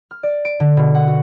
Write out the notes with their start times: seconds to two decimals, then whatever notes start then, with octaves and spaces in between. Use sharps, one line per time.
0.11 F6
0.23 D5
0.45 D7
0.60 D3
0.77 B2
0.95 F#5
1.08 F#4